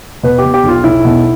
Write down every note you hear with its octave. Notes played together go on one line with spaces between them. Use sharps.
B2 B4
G4
B2
G4
B1
F4
B1 E4
B2